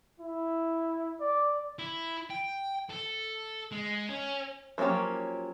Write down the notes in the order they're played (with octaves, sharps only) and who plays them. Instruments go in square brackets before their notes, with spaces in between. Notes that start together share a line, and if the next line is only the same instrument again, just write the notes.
[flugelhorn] E4
D5
[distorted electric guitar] E4
G5
A4
G#3
C#4
[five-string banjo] F3 F#3 A#3 C#4 G4